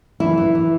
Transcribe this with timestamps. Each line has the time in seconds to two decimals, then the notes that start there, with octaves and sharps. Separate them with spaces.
0.20 E3 E4
0.37 E3
0.55 E3